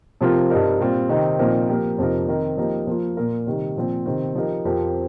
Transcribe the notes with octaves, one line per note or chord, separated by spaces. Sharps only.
C3 F3 C4 F4 A#4
G2 G3 C4 D#4 A#4
A#2 G3 C4 F4
C3 D#3 C4 D#4
A#2 F3 C4 D#4 A#4
F3 A#3 G4 A#4
F2 C3 F3 D#4 A#4
D#3 C4 D#4 A#4
F3 A#3 D#4 G4 A#4
F3 A#3 F4
A#2 A#3 F4 A#4
C3 D#3 G3
A#2 F3 C4
C3 D#3 C4
F3 D#4 G4 A#4
F2 F3 C4 G4 A#4